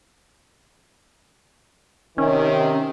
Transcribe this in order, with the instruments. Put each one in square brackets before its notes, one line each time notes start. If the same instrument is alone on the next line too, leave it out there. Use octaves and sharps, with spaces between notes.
[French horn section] C3 D#3 [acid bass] C#4